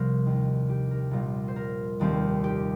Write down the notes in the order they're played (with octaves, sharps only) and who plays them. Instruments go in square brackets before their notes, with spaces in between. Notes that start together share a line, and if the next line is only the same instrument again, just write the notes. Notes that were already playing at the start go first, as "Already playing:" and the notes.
Already playing: [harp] C2 C3 F3 A#4 C5
D#2 D#3 C4
G4
A#4
A#1 A#2 G3 C4
C5
A#4
F1 D#2 D#3 G3 C4
G4